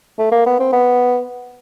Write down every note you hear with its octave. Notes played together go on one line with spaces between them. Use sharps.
A3
A#3
B3
C4
B3